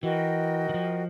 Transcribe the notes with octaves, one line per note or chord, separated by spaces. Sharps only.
E3 F#4 A#4 D#5 G5
E3
F3